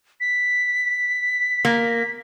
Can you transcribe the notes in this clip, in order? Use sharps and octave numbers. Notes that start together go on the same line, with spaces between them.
B6
A#3